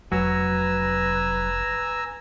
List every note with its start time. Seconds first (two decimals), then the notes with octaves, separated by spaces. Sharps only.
0.12 F1 F#3 B4 G#5 A#5 E6